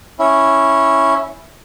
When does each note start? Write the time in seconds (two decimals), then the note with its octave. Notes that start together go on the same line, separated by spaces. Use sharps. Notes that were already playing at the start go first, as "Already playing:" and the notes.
0.19 C#4 E4